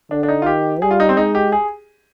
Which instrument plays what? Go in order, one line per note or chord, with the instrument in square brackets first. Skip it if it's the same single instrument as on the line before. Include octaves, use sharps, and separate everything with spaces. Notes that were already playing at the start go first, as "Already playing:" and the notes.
[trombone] D3 [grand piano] D4
[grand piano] D4
D#4
F4
[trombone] D#3 [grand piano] G4
[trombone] G3 [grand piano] G#4
[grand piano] F4
D#4
C4
[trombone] G#3 [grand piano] D#4
[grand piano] G4
G#4